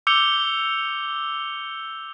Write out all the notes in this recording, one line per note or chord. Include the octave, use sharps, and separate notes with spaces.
D6 E6 G6 C#7 F7 G7